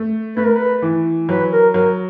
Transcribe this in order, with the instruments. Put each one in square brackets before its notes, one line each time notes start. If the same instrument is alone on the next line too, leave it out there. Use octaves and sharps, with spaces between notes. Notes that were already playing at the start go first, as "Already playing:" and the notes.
Already playing: [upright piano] A3
[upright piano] A3 [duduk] B4
[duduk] A#4
B4
[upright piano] E3
[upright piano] F#3 [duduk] B4
[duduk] A#4
[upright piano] F#3 [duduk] A#4